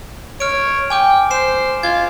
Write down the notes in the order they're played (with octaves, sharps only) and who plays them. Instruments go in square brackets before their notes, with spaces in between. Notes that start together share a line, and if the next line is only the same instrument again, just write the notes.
[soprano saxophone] C#5 [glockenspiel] F6 D7
[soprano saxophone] G5 [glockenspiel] G#5 D6 G6
[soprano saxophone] C5 [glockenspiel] C7 E7
[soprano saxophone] F4 [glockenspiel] G#6